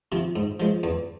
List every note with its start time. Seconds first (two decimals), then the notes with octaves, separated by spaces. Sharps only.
0.12 C3 F3
0.36 G#2
0.60 F3 G#3
0.83 E2